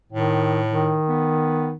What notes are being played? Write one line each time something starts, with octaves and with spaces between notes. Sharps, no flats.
A2 D#3
D#3
B3